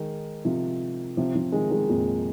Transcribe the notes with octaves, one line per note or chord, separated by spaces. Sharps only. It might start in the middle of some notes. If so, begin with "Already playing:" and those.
Already playing: D#3 G#3
C3 F3
C3 F3
C3 F3
D#3 G#3
D#3 G#3
F2 A#2